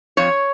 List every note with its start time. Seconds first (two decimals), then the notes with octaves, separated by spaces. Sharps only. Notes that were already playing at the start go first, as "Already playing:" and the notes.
0.17 F2 C#5